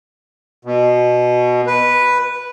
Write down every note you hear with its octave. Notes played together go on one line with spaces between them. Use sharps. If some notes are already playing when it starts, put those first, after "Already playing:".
B2
B4